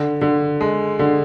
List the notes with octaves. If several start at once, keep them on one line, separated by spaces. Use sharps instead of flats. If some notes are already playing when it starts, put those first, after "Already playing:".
Already playing: D3
D3
G#3
D3